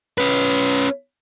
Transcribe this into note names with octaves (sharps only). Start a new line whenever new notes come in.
C#4 B4